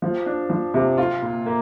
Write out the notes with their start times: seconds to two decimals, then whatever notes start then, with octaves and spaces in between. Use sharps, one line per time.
0.02 F3
0.26 D4
0.50 F3
0.74 C3
0.98 F4
1.22 A#2
1.46 A#3